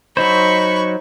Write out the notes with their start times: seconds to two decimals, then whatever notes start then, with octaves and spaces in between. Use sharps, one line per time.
0.17 F#3 D#4 C5 B5 C#6